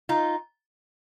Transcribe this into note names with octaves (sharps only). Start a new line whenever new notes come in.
D#4 F4